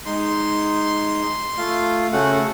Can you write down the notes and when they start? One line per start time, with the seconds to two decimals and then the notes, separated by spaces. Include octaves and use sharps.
0.06 G#3 D#4 C6
1.58 A3 F4 F5
2.13 C#3 A3 C#4 F#4 F#5